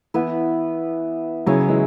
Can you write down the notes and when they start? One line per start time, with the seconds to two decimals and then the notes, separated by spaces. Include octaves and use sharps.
0.14 E3 B3 E4 B4
1.46 C#3 F#3 E4 G#4 C#5
1.69 E3 G#3